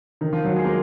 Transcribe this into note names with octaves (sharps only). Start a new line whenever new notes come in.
D#3 D#4
F3 F4
F#3 F#4
G#3 G#4
A#3 A#4